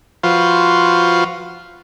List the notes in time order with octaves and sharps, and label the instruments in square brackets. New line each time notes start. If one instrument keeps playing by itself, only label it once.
[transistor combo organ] F3 F4 F#4 B4 C5 F5